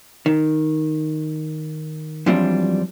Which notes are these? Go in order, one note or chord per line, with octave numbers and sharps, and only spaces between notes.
D#3
F#2 E3 F3 G3 C4 D4